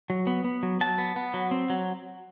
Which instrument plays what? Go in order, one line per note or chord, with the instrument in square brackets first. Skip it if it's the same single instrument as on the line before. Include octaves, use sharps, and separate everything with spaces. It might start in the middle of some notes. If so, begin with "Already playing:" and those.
[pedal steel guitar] F#3
B3
B3
F#3
F#3 A5
B3
B3
F#3
C4
F#3